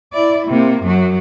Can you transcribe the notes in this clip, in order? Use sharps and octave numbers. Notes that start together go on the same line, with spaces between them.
E4 D5
C3 A#3
F#2 F#3